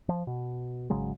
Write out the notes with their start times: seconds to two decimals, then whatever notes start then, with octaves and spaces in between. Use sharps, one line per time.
0.09 F3
0.27 B2
0.90 G#1 C#3 F#3 G#3